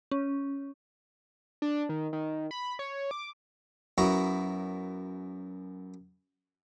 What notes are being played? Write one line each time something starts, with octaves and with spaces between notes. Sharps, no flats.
C#4
D4
D#3
D#3
B5
C#5
D6
F#2 B3 E4 A#5 C#6